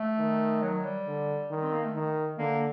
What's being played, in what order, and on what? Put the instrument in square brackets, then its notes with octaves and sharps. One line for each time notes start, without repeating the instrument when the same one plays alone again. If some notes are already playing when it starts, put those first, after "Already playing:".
Already playing: [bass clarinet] A3
[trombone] D#3
[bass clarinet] F#3
G3
[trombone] D3
D#3
[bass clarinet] C4
A#3
A3
[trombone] D#3
[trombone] D3 [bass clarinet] A#3